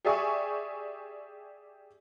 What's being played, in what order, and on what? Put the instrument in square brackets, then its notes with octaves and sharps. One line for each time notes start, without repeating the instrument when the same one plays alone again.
[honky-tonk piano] G4 G#4 D5 E5 G#5 C#6